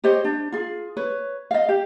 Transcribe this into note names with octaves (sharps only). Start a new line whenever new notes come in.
G4 C5 C#5 D#5
D4
F4 G#4
B4 C#5
D#5 F5
G4